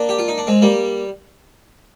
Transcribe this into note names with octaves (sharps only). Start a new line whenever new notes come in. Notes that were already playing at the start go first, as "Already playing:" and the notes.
Already playing: A#3 D4
G4
F4
D#4
D4
G#3 C4
G3 A#3